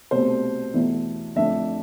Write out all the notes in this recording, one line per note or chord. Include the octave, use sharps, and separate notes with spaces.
C2 B2 A3 C5
E2 B2 A3 E4
F2 D3 A3 D4 E5